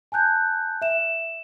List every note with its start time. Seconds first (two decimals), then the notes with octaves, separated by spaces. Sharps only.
0.12 G#5 A5 F#6 G6
0.82 E5 E7